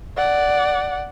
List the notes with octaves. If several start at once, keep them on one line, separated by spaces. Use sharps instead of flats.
D5 F#5